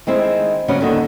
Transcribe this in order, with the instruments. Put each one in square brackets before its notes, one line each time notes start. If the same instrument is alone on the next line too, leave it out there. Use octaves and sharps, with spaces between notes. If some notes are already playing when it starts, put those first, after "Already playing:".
[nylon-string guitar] D#3 G#3 C4 E4
C#3 F#3 G3 B3 C#4
D#2 D3 D#3